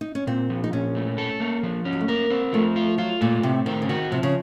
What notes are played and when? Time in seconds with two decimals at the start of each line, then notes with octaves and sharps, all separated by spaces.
0.01 D#4
0.15 C#4
0.27 A#2 C4
0.50 F3
0.64 D#4
0.73 A#2 C#4
0.95 A3
1.18 A4
1.40 A#3
1.63 F3
1.85 C#4
1.93 F#3
2.01 A3
2.08 A#3 A#4
2.30 C4
2.53 F3 A3
2.76 F4
2.98 F#3 F4
3.21 A#2 A3
3.43 A2 C3
3.66 D#3 C4
3.82 C#3
3.89 D#3 F#4
4.11 C3 F3
4.23 C#3